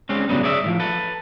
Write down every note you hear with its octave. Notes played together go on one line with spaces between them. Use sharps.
G3 G#3 C4 C#4
D2 G2 C#3 F#3 G3 B3
G#4 C#5 D5 E5
A2 E3 F3
A4 B4